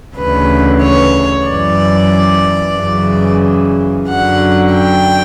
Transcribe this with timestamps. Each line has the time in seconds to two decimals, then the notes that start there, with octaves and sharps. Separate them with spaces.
0.16 D2 C#3 E3 B4
0.81 C#5
1.47 F#2 E3 D5
2.77 F#2 C#3 E3
4.07 F#2 D3 F#3 F#5
4.73 G5